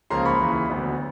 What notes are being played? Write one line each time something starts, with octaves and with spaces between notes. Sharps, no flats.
C#2 C#3 F3 A#3 A#5 C6
B5 C#6
D#2 C#3 E3
D2 D3 F#3 B3